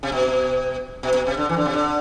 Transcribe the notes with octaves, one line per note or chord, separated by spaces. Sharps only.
C3
B2
B2
B2
C3
D3
E3
D3
C3
D3